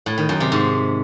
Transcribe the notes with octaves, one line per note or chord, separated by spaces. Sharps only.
A2
D#3
F#2
C3
G#2